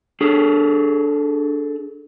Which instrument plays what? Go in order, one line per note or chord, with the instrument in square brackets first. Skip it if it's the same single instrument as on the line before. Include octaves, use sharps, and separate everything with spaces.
[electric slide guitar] D4 G#4 A4